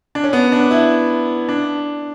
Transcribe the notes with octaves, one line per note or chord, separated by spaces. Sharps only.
D4
C#4
B3
D4
E4
D4